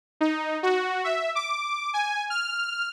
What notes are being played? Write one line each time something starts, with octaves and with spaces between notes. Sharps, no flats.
D#4
F#4
E5
D6
G#5
F6